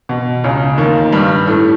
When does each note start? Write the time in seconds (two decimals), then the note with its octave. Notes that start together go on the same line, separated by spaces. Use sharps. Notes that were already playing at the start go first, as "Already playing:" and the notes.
0.09 B2
0.44 C#2 C#3
0.78 D#2 D#3
1.12 G2 G3
1.47 A2 A3